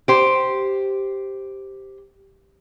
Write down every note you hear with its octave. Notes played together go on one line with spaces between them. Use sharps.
G4 C5